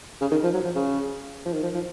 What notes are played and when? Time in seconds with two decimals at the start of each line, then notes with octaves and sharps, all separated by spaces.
0.21 C#3
0.31 D#3
0.43 F3
0.54 F#3
0.64 F3
0.76 C#3
1.45 F3
1.53 D#3
1.63 F3
1.75 F3